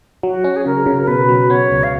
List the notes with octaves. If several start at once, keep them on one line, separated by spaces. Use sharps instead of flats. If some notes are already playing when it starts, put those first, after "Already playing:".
F#3 F#4
C#4
G#4
C#3 A#4
C#3
A#4
B2 B4
F#3
B3 C#5
C#2
F5